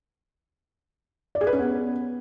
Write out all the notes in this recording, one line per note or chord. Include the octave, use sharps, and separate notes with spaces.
D5
G#4
B4
C#4
B3